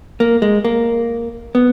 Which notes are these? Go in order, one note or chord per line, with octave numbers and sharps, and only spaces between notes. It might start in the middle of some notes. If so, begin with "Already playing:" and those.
A#3
G#3
A#3
B3